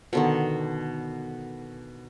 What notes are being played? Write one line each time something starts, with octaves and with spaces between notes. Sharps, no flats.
B2 D3 D#3